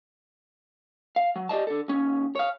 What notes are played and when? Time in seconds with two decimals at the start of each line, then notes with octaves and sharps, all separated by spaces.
1.16 F5
1.36 F#3
1.49 G4 D5 D#5 A5
1.67 D3 A4
1.88 D#2 C#4
2.35 C#5 F5